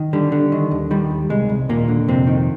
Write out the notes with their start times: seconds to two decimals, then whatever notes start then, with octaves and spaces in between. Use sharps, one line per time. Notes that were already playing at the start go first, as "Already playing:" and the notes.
Already playing: D#3
0.13 D3 G3
0.32 D3
0.52 D#3
0.71 D#2
0.91 D#3 G3
1.11 D#2
1.30 C2 G#3
1.49 C2
1.69 D#2 A#2 A#3
1.88 D3
2.08 F2 C3 C4
2.27 D#3